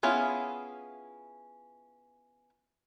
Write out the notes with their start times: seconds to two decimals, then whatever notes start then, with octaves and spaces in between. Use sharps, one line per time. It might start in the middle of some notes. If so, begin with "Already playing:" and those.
0.03 B3 C#4 E4 F4 G#4